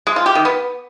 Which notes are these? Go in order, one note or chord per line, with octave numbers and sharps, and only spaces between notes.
G#3
F4
G4
D#3
B3